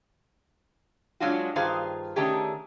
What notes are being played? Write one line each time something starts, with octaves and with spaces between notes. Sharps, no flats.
F#3 G#3 D4 F4 F#4
G2 D#3 F4 G#4 C5 F5
D#3 A3 C#4 D4 G4 G#4